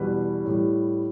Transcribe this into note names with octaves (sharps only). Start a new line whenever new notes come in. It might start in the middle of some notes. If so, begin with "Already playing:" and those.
Already playing: E2 B2 G3 B4
A2 G3